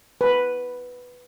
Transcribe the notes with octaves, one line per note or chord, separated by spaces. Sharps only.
B4